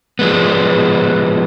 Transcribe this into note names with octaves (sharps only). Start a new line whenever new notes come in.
F3 G#3 B3